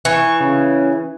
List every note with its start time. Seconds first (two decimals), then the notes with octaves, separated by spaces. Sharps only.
0.05 E3 C#6
0.40 C#3